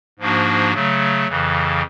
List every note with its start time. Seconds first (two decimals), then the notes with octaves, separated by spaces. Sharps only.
0.19 G#2 F3 A#3 D4 F#4
0.73 C#3 F#3 A3
1.28 F2 C#3 E3